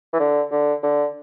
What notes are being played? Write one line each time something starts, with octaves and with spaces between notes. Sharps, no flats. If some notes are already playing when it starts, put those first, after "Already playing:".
E3
D3
D3
D3